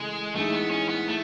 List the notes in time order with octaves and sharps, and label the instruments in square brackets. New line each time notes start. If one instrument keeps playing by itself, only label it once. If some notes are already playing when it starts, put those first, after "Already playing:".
Already playing: [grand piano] C#3 E3 A3 [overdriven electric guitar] G#3
[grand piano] A2 E3 G#3 D#4 G#4 [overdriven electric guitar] A3
[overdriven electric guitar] B3
C#4
B3
A3